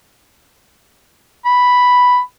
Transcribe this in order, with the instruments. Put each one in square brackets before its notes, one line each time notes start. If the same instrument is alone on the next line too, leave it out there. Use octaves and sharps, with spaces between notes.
[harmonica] B5